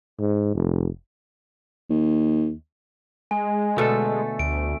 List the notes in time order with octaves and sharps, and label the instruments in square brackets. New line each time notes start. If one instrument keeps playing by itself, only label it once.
[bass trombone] G#2
F1
[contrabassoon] D#2
[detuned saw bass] G#3 [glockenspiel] G#5
[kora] B2 D3 [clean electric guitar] A3 A4
[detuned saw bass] D2 [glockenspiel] D7